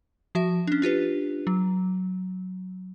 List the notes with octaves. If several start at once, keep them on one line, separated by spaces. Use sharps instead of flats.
F3 F#4 E5
C#4 D4
D4 F4 G4 B4
F#3